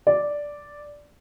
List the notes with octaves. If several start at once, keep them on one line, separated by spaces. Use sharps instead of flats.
D5